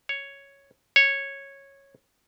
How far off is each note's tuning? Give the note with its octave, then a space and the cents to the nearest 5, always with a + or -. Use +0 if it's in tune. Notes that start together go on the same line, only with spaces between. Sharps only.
C#5 +0
C#5 -10